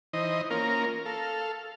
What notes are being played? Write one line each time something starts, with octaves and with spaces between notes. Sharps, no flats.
E3 D#4 C5 D#5
A#3 C#4 F4 A#4
A4 F5